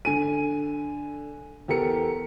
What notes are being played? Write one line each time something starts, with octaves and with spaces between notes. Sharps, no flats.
D3 G#5 D#7
E2 G4 A4 A#4 C#7